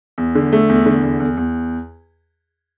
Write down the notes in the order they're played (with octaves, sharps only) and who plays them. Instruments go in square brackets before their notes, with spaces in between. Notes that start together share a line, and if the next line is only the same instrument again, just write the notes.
[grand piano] E2
D3
A3
E2
D3
E2
E2
E2